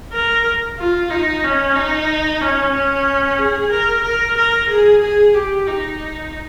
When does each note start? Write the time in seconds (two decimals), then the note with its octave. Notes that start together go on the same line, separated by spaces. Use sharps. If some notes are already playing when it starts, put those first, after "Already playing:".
0.13 A#4
0.78 F4
1.10 D#4
1.44 C#4
1.76 D#4
2.41 C#4
2.74 C#4
3.39 G#4
3.71 A#4
4.04 A#4
4.37 A#4
4.69 G#4
5.02 G#4
5.34 G4
5.67 D#4